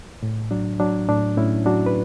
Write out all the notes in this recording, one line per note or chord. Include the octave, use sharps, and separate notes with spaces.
A2
F#3 D4
F#3 D4
A2 D4
A2 C#4 E4
F#3 D4 F#4
B4